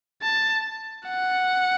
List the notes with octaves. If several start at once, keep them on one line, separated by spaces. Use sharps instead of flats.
A5
F#5